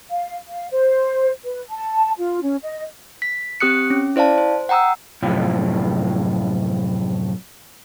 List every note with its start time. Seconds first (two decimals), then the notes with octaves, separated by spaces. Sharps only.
0.10 F5
0.49 F5
0.71 C5
1.44 B4
1.70 A5
2.18 F4
2.42 C#4
2.62 D#5
3.22 B6
3.60 C4 G4 D#6 F#6 C#7
3.90 C#4
4.16 E4 C5 D5 F5 A5
4.38 C5
4.69 F#5 G5 A#5 D#6 E6
5.22 F#2 A2 C3 F3